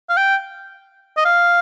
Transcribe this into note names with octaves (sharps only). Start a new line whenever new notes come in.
F5
G5
D#5
F5